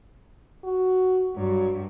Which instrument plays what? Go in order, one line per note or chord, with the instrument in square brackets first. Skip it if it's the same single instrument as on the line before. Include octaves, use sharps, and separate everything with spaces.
[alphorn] F#4
[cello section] G2 [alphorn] F#3